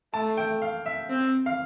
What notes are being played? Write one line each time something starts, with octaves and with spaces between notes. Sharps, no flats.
A3 A5
G5
F5
E5
C4
F5